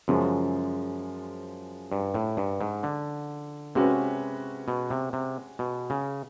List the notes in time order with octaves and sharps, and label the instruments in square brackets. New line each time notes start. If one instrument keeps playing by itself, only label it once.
[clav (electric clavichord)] F#2 [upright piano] C#3 F3 G#3
[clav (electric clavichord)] G2
A2
G2
G#2
D3
[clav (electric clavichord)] C3 [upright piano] G#3 C#4 F#4 B4
[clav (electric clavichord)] B2
C3
C3
B2
C#3